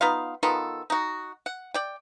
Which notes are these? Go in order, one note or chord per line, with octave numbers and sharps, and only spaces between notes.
B3 D#4 F4 F5
D#3 B3 F4 A4
D#4 F#4
F#5
D5 G5